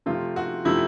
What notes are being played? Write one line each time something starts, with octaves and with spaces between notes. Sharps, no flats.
C3 F3 A3 F4
F#4
C3 F3 A3 E4